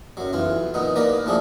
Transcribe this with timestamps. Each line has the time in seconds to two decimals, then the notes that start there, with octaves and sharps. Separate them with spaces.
0.17 F#2 F#3
0.33 B1 E3 F4
0.74 A#2 B3 D#4
0.96 D#2 A#3 A#4 B4 D5
1.26 A2 F3 D4 G#4 A4